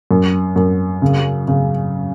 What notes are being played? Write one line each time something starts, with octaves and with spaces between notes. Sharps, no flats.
F#2
F#2
C#3
C#3